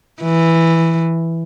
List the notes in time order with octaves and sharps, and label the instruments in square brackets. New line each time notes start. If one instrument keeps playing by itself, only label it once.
[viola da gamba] E3